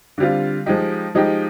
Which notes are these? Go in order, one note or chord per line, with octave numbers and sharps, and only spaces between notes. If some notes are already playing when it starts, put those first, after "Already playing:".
D3 G3 C4 F4
F3 G#3 D#4 G4
F3 G#3 D#4 G4